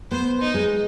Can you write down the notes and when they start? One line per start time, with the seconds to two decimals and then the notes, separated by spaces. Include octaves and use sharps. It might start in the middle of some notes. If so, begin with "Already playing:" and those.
0.11 B3 C5
0.40 D#4
0.54 G#3